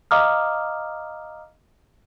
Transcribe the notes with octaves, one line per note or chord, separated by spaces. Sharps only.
D#5 F5 A#5 D6 D#6 F6